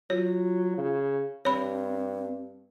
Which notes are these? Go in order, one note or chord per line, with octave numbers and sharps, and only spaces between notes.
F#3 F4 C#5
C#3
G2 C4 C#5 B5